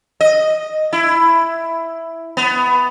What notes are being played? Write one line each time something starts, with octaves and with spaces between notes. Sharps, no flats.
D#5
E4
B3